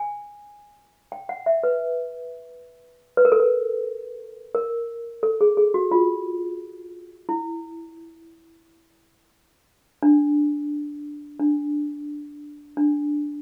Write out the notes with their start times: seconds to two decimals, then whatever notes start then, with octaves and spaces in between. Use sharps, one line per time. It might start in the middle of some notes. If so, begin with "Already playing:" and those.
Already playing: G#5
1.12 G5
1.29 F#5
1.46 E5
1.63 B4
3.17 B4
3.25 A#4
3.32 A4
3.40 A#4
4.55 A#4
5.23 A4
5.41 G#4
5.57 G#4
5.74 F#4
5.91 F4
7.29 E4
10.03 D4
11.39 D4
12.77 D4